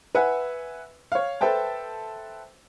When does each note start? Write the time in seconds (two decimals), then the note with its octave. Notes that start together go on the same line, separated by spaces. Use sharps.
0.15 B4 E5 F#5 G#5
1.12 C#5 F5
1.41 A4 B4 C5 E5 G5 A5